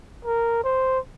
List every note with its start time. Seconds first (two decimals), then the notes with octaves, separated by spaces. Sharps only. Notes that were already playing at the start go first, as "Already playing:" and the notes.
0.25 A#4
0.64 C5